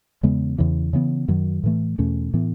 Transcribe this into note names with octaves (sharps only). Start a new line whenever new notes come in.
E2 C#3 G#3 B3
E2 C#3 E3
C#3 E3 B3
F#2 D#3 F#3
A2 E3 A3
E2 B2 A3 C#4
A2 E3 B3